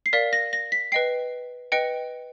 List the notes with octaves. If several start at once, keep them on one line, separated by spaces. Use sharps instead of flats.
C7
A#4 D5 F5 B6
A#6
A#6
B6
B4 D#5 G5 C7
B4 D#5 G5 C#7